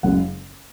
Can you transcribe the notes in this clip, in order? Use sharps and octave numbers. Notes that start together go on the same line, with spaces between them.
F#1 F#2 C#3 G#3 F#5